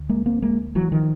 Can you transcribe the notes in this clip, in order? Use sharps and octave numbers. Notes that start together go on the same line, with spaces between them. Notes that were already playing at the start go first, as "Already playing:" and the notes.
Already playing: D2
G#3 A#3
A#3 C4
G#3 A#3
E3 F#3
D#3 F3